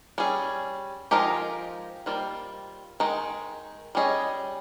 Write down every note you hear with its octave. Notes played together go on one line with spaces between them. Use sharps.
G3 C#4 G#4
F3 G#3 D#4 G4 A#4
D#3 G3 A#3 F4 C5
D#3 G#3 D#4
G3 C#4 G#4 D#5